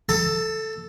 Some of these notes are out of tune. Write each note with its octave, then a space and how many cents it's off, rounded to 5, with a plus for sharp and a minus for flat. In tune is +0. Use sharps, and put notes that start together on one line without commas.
A4 +0 A5 +25